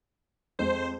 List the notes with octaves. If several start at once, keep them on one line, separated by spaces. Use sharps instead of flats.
F2 G#3 C5